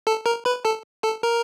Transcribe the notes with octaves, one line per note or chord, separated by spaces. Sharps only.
A4 A5
A#4 A#5
B4 B5
A4 A5
A4 A5
A#4 A#5